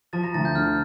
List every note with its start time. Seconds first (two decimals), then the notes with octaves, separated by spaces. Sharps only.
0.13 F3 A5 A6
0.23 A#5 A#6
0.34 D2 A5 A6
0.45 G6
0.55 D3 F6